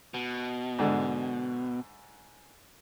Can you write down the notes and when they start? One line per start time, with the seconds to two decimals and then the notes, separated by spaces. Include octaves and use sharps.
0.14 B2
0.79 G#2 D3